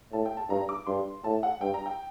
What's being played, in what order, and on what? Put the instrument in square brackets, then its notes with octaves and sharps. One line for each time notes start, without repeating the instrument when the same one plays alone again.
[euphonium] A2 [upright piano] A5
[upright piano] G5
A5
[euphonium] G2 [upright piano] A#5
[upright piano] D6
[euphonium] G2 [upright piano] C6
[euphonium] A2 [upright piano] A5
[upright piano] F#5
[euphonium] G2 [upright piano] G5
[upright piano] A#5
G5